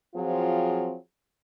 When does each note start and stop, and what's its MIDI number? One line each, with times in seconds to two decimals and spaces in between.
0.15 0.95 53
0.15 0.95 54
0.15 0.95 60
0.15 0.95 65
0.15 0.95 68